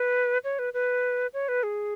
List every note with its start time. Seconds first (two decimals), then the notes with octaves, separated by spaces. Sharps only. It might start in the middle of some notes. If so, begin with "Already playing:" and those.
Already playing: B4
0.44 C#5
0.59 B4
0.73 B4
1.33 C#5
1.48 B4
1.63 G#4